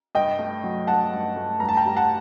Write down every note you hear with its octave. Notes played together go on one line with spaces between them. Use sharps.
G2 D#5 G5
A3
F#3
G2 F#5 A5
G2
A3
G2 A#5
A5
G5 A#5
G3
F#5 A5